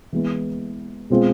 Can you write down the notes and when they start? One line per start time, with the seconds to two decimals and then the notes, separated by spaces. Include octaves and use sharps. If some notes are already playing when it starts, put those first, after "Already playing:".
0.12 E3 G#3 B3 E4
1.10 B2 G#3 C4 F4